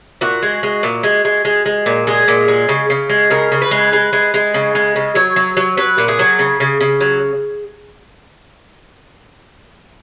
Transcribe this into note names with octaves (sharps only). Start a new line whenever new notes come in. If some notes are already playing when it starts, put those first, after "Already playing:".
A#2 F#4
G#3
G#3
A#2
G#3
G#3
G#3
G#3
A#2
G#3 G#4
A#2
G#3
C#3
C#3
G#3
C#3 A#4
C#3
B4
G#3
G#3
G#3
G#3
C#3
G#3
C#3
F#3 C#5
F#3
F#3
F#3 B4
A#2
G#4
F#3
C#3
C#3
C#3
F#3